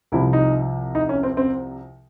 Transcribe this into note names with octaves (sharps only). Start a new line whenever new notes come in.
C2 C3 F3 E4
D#4
D#4
C#4
C4
C4